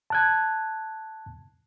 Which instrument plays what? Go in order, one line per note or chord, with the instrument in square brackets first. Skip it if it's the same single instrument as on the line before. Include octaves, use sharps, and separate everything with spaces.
[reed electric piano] A5 F#6 G#6